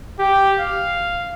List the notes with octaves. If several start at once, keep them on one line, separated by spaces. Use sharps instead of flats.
G4
F5